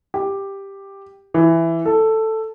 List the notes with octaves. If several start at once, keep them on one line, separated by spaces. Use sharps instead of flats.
G4
E3
A4